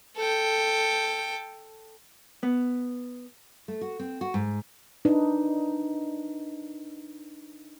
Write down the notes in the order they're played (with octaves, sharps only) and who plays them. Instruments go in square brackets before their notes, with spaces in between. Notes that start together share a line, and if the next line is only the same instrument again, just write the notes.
[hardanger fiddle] A4 G5
[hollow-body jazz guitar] B3
[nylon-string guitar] A3
F#4
C4
F#4
G#2
[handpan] D4 D#4 B4